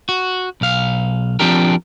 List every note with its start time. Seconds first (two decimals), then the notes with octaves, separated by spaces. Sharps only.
0.09 F#4
0.61 B1 F5
1.39 F3 C4 D4 G4 A#4